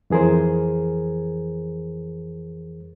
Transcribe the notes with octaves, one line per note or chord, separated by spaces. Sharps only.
F2 E3 G#4 A#4 C5